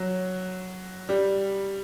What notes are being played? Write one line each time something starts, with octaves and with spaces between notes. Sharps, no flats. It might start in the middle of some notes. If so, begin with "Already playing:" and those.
Already playing: F#3
G3